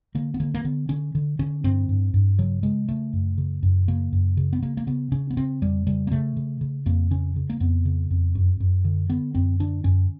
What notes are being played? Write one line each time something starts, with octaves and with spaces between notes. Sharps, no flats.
D3 A#3
B3
D3 A#3
A#3
D3 B3
D3 C#4
D3
D3 C#4
G2 C4
G2
G2
C#3 F#3
C#3 G#3
C#3 A3
F#2
C#3
F#2
C#3 A#3
F#2
C#3
B3
C#3 A#3
A#3
C#3 B3
C#3 C#4
B3
C#3 C4
F2 G3
C#3 G3
A#3
C#3 A3
C#3
C#3
F2 A#3
C#3 C#4
C#3
A#3
F2 B3
C#3
F2
F#2
F#2
D3
D3 B3
F#2 C4
D3 D4
F#2 C#4